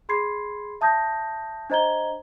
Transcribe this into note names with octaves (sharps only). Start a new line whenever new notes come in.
G#4 B5 C6 G#6 C7
E5 A5 D#6 G6 A#6
D4 C5 D#5 A#5 G#6 G7